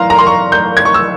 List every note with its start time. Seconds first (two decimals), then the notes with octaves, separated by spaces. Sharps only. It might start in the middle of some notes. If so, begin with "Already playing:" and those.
Already playing: E3 F5 A#5 C6
0.10 A#5
0.19 C6
0.27 C#6
0.52 G6
0.77 G#6
0.85 C#6
0.94 E6